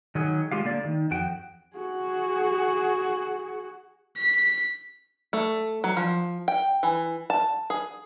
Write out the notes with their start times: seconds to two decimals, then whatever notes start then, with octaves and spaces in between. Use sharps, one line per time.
0.15 D#3 F#3 G#4
0.51 G#3 F4 G4 F5
0.65 D3 A#3 D5
0.84 D#3
1.11 F2 F#4 G5
1.76 F#4 G#4
4.17 B6
5.33 A3
5.84 F#3
5.97 F3
6.48 G5
6.83 E3
7.30 A5
7.70 G#4